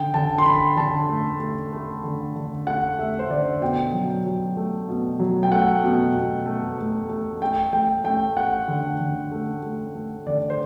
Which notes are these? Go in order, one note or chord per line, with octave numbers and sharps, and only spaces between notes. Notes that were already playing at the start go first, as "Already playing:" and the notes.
Already playing: D3 G5
D3 A5
C6
D3 B5
D3 A5
A3
A3
A3
D3
D3
A3 F#5
A3 E5
C5
D3 D5
B2 G5
F#3
F#3
A3
B2
F#3
G5
A3 F#5
B2
B2
A3
A3
A3
A3 G5
A3 G5
A3 G5
A3 F#5
D3
D3
A3
A3
A3
D3 D5
C5